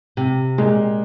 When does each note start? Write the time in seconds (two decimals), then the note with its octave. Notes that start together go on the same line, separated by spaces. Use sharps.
0.17 C3
0.58 A#2 G#3